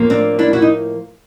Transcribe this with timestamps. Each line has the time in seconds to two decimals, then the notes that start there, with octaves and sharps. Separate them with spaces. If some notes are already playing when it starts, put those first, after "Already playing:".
Already playing: A2 F3 A#3
0.10 C4 D4
0.39 D4 E4
0.53 E4 F#4
0.62 D#4